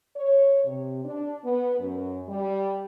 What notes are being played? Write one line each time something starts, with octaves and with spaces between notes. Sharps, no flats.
C#5
C3
D4
B3
F#2
G3